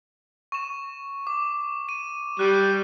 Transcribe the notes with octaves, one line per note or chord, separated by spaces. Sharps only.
C#6 E7
D6
D#7
G3 F#6 D#7